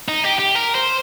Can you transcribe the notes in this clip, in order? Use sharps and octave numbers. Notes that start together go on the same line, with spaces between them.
D#4
G4
G4
A#4
C5